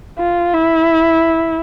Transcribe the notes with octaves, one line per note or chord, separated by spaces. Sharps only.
F4
E4